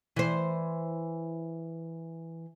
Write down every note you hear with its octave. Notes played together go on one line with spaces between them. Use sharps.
E3 C5